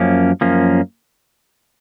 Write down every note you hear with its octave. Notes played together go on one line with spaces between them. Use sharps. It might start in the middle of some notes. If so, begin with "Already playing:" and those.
Already playing: F#2 F3 A#3 C#4
F#2 F3 A#3 C#4